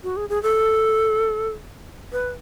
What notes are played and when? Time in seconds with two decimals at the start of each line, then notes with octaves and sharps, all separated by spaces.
0.03 F#4
0.17 G#4
0.29 G#4
0.43 A4
2.12 B4